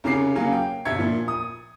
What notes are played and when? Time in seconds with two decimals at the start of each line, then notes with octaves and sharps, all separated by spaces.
0.04 C2 C#3 C#4 D6 C7
0.35 C#3 F#3 A#3 C#4 G#4 F5
0.52 G5
0.85 G1 G2 B2 E5 G#6 C#7
0.99 A#2 F3
1.28 D#6